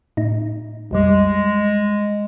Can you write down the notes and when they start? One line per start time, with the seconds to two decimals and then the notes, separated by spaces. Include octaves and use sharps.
0.17 A2 D#4
0.91 B1 F2 G3 G#3